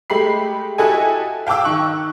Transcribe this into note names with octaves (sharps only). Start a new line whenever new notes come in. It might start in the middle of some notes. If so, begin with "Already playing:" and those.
G#3 A3 G4 B5 C7
E4 F#4 G4 A4 D#5 G#5
F5 G5 A5 D6 E6
D#3 C#6 F#6